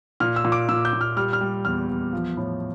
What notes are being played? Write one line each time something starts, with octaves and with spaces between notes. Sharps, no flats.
A#2 F6
E6
A#2
D6
A#2 E6
G6
A#2
F6
G3 F6
F6
G3
E2 F6
E2
F3
A2